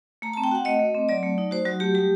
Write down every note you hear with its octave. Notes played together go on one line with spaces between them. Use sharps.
A3 A#5
C4 A5
G5
F#4 F#5
A3 D#5
A3
C4
F#3 D5
A3
D#4
F#4 C5
F#3 F#4
A3 G4
G3 G4